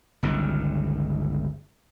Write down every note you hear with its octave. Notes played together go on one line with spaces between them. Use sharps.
G1 C#2 D#3